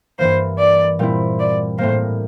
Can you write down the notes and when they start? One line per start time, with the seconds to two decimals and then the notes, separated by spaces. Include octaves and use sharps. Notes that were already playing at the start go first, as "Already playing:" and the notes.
0.19 G2 E3 A#3 C5
0.58 D5
0.99 A#2 G3 C4 E4
1.39 D5
1.78 A2 G3 A#3 C5